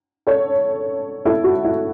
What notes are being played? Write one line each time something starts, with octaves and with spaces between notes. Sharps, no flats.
A4 C#5
E4 A4
F#4
E4